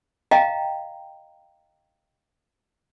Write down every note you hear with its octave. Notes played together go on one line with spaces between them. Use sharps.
D#5 F5 G5 A#5